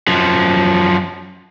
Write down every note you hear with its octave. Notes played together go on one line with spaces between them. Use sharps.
F#2 F3